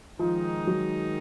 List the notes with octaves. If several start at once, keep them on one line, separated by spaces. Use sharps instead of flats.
D#3 F3 G#3 D#4
F#3